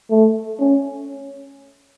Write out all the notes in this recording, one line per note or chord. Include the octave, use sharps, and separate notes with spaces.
A3
C#4